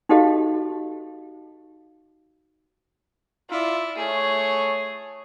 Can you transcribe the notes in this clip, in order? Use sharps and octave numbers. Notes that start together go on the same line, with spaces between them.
D#4 F#4 G4 A4 D#5 F5
E4 F4 D5 E5
A3 G#4 C#5